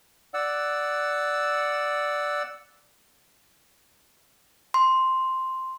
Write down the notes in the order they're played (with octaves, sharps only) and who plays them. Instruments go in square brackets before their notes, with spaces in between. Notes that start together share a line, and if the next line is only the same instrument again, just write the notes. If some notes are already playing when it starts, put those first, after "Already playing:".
[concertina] D5 F#5 E6
[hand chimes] C6